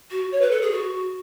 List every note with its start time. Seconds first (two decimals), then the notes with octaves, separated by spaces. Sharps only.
0.11 F#4
0.32 C#5
0.41 B4
0.52 A4
0.62 G#4
0.72 F#4